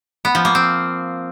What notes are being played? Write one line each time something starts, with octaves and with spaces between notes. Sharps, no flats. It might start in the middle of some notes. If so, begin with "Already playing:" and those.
B3
F3
A#3
C4